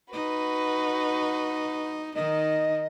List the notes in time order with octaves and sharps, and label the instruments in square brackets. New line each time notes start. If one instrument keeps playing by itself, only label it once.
[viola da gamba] D#4 [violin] F#4 B4
[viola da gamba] D#3 D#4 [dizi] D#5